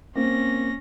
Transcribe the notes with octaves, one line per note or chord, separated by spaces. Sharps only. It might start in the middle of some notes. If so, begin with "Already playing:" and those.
A#3 C4 C#4 A#6